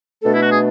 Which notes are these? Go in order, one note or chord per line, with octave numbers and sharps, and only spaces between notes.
B2 A3 D4 A4
E4
F#4
G#4